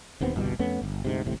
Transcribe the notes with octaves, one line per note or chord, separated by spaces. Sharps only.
E1 D#2 B3 C4
G1 C2 B2 G3
F2 A3 B3 C#4
G1
D2 G#2 C3
D#1 G#1 A2 C3